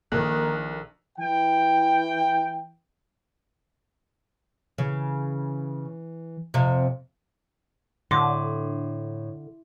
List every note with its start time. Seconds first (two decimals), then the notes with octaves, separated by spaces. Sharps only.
0.12 A#1 D#3 A#3 A4 F#6
1.19 E3 G5
4.78 C#3 E3
6.54 F2 C3
8.11 A2 D3 C6 D6